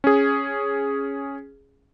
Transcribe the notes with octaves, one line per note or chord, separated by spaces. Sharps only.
C#4 G#4